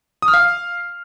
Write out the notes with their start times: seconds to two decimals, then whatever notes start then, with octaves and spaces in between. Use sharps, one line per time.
0.22 D#6
0.28 F6
0.34 F5